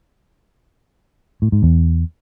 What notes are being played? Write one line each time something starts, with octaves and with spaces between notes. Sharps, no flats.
A2
G#2
E2